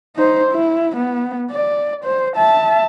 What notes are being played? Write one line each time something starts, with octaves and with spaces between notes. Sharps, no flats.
D#4 C5
E4
B3
D5
C5
E5 A5